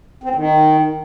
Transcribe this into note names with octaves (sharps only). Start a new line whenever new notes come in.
C4
A2
D#3